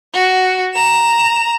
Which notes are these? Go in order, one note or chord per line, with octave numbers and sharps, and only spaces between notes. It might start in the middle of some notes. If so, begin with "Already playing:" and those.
F#4
A#5 E7